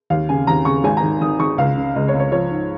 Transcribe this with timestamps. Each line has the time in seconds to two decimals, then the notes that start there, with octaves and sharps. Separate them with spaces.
0.10 D#2 F5
0.29 C#3 G#5
0.47 D#2 A#5
0.65 C#3 C#6
0.84 G#1 G#5
0.97 A#5
1.03 D#3
1.21 D#3 D#6
1.39 D#3 C#6
1.58 C#2 F5
1.77 C#3
1.96 C#2 D#5
2.08 C#5
2.14 C#2
2.19 C#5
2.32 F3 C#5
2.51 G#2